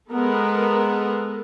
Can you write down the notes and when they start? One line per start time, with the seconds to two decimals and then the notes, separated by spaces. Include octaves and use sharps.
0.12 G#3 B3 A4 A#4